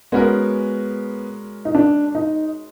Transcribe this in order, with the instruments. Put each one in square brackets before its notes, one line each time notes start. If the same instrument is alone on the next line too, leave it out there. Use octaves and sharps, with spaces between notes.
[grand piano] G#3 C#4 F#4 A#4 [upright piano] B3
[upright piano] D#4
D4
D#4